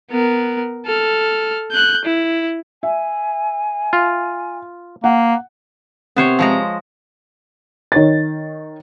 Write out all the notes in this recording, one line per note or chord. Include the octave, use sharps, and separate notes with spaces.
B3 A#4
A4 F6
F#6 G6
E4
E5 G#5
F4
A#3 F#5
C3 B3 C5 C#5
F3 G#3 A#5
D#3 C#5 A6